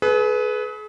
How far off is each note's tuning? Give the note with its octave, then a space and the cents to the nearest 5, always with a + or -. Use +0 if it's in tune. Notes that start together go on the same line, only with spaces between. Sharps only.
G#4 +40 B4 +0